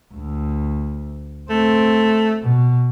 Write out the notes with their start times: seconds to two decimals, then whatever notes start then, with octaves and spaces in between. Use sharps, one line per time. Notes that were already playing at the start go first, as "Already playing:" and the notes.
0.14 D2
1.50 A3 C4
2.43 B2